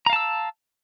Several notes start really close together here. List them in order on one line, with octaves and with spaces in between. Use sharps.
A#5 F5 A5 E6